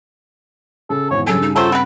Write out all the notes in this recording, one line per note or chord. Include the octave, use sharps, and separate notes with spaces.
C#3 A4
G#1 E2 C#5
G2 C#3 F#3 A4 G#5
D#4
F#3 A3 F4 A4 C5
B3 C4 B4